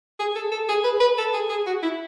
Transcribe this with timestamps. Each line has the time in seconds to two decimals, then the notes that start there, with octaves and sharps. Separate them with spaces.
0.20 G#4
0.36 A4
0.52 A4
0.69 G#4
0.84 B4
1.00 B4
1.18 A4
1.34 G#4
1.50 G#4
1.66 F#4
1.83 E4